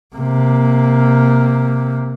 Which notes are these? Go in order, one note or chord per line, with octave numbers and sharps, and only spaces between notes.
C3 A#3